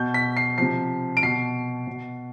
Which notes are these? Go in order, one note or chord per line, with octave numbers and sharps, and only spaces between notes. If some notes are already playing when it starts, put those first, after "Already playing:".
Already playing: B2 G6
B6
C7
C3 F3 C7
D7
B2 C7
B2